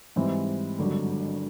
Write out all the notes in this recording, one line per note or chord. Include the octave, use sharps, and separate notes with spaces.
G#2 E3 G3 C4
G#1 G2 D3 F#3